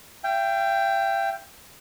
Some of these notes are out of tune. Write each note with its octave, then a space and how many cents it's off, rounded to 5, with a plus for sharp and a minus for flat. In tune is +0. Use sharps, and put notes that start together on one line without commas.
E5 +45 G5 +0